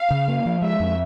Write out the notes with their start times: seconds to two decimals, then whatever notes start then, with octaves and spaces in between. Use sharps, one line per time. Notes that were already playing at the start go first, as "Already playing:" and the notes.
Already playing: F5
0.11 C#3
0.28 A#3
0.46 F3
0.62 G#3 E5
0.80 F2